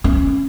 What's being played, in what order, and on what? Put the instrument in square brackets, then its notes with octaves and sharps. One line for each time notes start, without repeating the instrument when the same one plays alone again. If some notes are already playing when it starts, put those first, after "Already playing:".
[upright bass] C#4